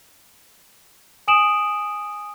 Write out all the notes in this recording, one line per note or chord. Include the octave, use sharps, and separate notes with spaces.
G#5 D#6 D7 E7 F#7